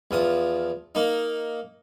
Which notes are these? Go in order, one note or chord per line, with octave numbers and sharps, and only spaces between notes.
E2 F3 D#6
A#3 D#4